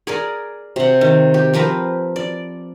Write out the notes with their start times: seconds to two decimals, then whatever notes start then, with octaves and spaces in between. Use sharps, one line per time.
0.07 G#4 A#4 D5
0.76 C3 F#5
1.01 D#3
1.34 G4
1.54 F3 C4 A#4 B4
2.16 D5